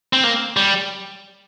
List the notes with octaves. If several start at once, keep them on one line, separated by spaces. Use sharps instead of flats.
C4
A#3
G3